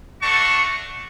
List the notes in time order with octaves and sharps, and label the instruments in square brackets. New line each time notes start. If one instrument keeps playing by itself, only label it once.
[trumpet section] A3 D4 F#4 C#6